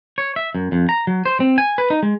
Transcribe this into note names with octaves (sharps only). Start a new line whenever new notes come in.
C#5
E5
F#2
F2
A#5
F#3
C5
C4
G#5
B4
D#4
G#3